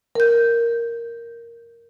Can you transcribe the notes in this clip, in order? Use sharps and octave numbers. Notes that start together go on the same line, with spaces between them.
A#4 G6